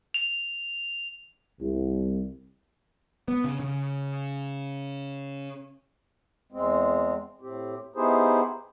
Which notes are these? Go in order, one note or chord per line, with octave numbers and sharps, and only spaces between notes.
F7
C2
B3
C#3
C#3
E2 G#3 C4
A2 C4 G4
B3 D#4 E4 G4 G#4 C5